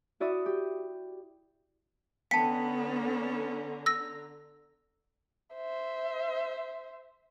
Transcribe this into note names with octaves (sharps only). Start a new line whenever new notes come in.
E4 F#4 D5 E5 D#6
G4
D3 B3 C#4 G5 A5 A#5 B6
E6 A#6
C5 E5